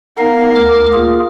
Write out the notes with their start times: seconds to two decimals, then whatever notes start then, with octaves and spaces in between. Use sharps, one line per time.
0.18 B3 D#4 A#4 F5
0.55 D2 D6 F6
0.93 A#3 F4 G#4